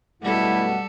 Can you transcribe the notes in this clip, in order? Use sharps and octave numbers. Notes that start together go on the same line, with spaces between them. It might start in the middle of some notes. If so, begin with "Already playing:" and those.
F#2 B2 G3 A3 E4 A4 F#5